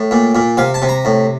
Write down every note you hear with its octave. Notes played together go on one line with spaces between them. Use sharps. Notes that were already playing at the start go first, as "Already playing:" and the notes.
Already playing: A2
A#2
A#2
C3 F5
A5
C3
A#5
A2